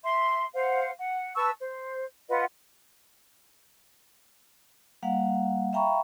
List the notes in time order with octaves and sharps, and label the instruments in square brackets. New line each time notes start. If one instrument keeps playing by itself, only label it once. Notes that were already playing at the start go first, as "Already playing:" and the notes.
[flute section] E5 C6
C5 F5 F#5
F#5
B4 A5 C#6 E6
C5
F4 B4 D#5 F#5
[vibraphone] G3 A#3 F5 F#5
E5 F5 G5 A#5 B5 C#6